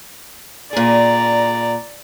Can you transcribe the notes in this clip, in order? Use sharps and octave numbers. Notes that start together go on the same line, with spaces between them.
A#2 G#4 D5 A#5